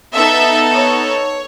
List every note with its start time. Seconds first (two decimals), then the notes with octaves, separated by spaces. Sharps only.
0.15 B3 D#4 A4 E5
0.75 C#5